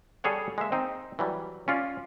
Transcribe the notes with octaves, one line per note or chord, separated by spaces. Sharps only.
G3 G#4 A4 C#5 F#5
G#3 A#3 E5
C4 D#4
E3 F#3 G3
C#4 F4 D5